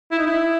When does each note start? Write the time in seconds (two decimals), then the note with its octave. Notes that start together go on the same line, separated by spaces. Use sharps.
0.12 E4
0.18 D#4
0.26 E4